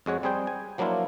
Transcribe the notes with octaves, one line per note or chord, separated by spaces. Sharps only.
F2 G#3 F#4 C#5
G3 C4 G#4 C5 G5
G#5
F3 F#3 A#3 D4 E4 F4